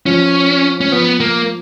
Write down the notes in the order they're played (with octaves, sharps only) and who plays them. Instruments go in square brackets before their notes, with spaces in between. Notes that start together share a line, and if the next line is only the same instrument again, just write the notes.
[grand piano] F3 [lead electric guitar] C#4
[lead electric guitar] C#4
[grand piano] F3 [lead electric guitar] B3
[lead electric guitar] A#3